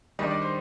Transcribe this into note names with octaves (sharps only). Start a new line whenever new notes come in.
D#3 G3 D4 D#5
D5
C5